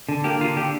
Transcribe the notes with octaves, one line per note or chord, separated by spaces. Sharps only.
D3
A#3 G4
D3 F4
D3 G4